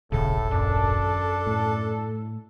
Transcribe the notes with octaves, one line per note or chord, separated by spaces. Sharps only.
D#1 G#1 A2 C#3 A4
F#2 D4
A2